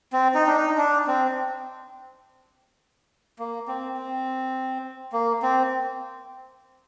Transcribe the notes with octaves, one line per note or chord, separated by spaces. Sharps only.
C4
D#4
D4
D#4
D4
C4
A#3
C4
C4
A#3
C4